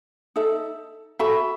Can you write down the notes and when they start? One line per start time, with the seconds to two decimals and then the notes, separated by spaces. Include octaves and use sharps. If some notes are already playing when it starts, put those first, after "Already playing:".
0.36 D#4 A4 E5
1.19 F#4 A4 E5 B5